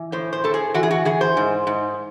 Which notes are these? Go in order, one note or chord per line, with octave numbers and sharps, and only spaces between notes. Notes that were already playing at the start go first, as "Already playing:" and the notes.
Already playing: E3
A2 C5
C5
A2 A4
G#4
E3 F#4
G#4
F#4
E3 G#4
C5
G#2
G#2